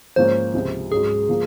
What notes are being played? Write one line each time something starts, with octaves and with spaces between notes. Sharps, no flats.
G#2 F3 A#3 C#4 C5
C#2 C3 F3
G#2 F#3 C#4 G#4
F3 A#3